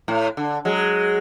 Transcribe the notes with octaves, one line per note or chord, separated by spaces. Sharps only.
A2
D3
F#3 G#3